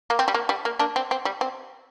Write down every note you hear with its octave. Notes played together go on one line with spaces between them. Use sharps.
A#3
C4
G3
A#3
G3
A#3
A#3 D4
C4
C4
G3
C4